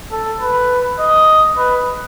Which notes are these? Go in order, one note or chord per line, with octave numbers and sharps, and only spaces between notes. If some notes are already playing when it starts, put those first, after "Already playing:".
A4
B4
D#5
B4